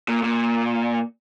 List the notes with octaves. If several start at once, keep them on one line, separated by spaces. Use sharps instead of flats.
A#2
A#2